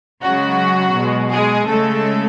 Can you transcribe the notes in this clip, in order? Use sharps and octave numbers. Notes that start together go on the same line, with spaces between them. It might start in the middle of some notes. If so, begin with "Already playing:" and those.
C#3 F#3 G#3 F#4
B2 G#3
G#3 G#4
C#3 G#3 A3 A4